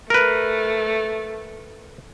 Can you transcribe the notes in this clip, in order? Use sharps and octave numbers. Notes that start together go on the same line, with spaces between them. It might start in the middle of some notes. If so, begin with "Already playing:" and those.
A3 A#4 B4